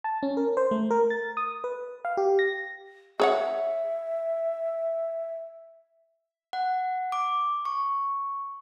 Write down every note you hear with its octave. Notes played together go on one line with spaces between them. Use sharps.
A5
C#4
A#4
C5
A3
A#4
A6
D#6
B4
F5
G4
A#6
G#4 C#5 E5 F#5
F#5
D6
C#6